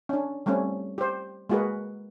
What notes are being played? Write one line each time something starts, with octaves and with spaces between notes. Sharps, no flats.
C#4 D4
G3 A3 C4 C#4
G4 C5
G#3 A#3 F#4 G#4 A#4 B4